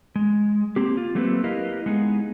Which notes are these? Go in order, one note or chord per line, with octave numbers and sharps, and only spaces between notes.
G#3
A#3 C4 G4
F4
F#3 A3 A#3 C4 G4 B4
E4 G4 A#4 B4 D#5 F5
G#3 B3 D#4 G#4